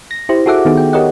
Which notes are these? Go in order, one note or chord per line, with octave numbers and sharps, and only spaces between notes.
A#6
E4 G4 C5
F#4 G#4 A4 E5 F#5 D6
D#3 B3 D#4 G#4
G5
G4 A#4 C#5 D#5 F#5